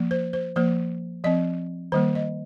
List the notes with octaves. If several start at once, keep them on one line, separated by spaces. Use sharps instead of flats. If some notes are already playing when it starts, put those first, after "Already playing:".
Already playing: F3 A#3
C5
C5
F3 A#3 C5
F3 C4 D#5
D#3 G3 A#3 C5
D#5